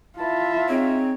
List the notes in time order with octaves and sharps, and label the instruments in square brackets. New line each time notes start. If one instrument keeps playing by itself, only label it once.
[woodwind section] E4 A5 [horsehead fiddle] F4 E5
[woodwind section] G#3 D#4 C#5 [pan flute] C4